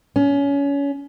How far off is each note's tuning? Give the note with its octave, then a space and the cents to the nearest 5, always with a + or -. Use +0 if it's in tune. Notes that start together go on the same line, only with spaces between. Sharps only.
C#4 +25